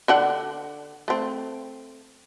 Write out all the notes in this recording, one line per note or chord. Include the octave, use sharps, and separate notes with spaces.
D3 D4 F#5
A3 C4